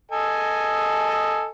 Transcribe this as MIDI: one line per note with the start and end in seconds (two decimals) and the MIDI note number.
0.11 1.49 69
0.11 1.49 75
0.11 1.49 80